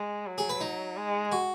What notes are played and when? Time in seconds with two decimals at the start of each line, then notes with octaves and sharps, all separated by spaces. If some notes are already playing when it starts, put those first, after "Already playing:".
Already playing: G#3
0.26 F#3
0.38 G#4
0.49 B4
0.61 D#4
0.97 G#3
1.32 F#4